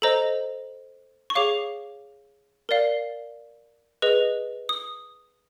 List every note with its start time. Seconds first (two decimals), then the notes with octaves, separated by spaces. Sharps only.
0.02 A4 C5 D#5 A#5
1.30 C#6
1.35 G#4 C#5 F5 D6
2.69 A#4 D5 F5
4.02 G#4 B4 D#5
4.69 D#6